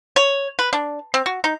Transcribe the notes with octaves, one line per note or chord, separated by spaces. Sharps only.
C#5
B4
D4
C4
F#4
D#4